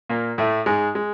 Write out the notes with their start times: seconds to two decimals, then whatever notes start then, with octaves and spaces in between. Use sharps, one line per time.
0.09 A#2 A#3
0.38 A2 A3
0.66 G#2 G#3
0.95 G#3